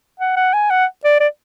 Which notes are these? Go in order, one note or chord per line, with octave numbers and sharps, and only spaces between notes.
F#5
F#5
G#5
F#5
D5
D5